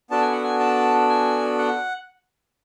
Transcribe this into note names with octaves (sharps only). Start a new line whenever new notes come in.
B3 D4 F#4 A4 A5
G#5
F#5
G#5
A5
G#5
F#5